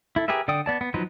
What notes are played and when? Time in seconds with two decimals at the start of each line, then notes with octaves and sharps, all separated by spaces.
0.16 E4 A4
0.28 G4 G#4 A#4 B4 E5
0.48 D3 D5 G5 D#6
0.66 B3 D5 A5
0.81 B3
0.94 F3 F#3 D#4 B4 C5